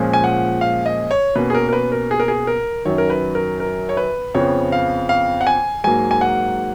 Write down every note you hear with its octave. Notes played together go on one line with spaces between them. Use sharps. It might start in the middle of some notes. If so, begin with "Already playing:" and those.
Already playing: A#2 F3 G#3 C#4
G#5
F#5
F5
D#5
C#5
B2 A#3 C#4 B4
G#4
A#4
A#4
B4
A#4
G#4
A#4
G#4
A#4
F#2 D#3 F#3 C#5
A#4
B4
A#4
A#4
C#5
B4
F2 C#3 F3 B3 C#5
F5
F5
F#5
G#5
G#2 F#3 A#3 G#5
G#5
F#5